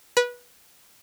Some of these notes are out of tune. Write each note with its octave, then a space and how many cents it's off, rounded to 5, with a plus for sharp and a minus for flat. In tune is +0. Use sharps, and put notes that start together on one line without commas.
B4 -20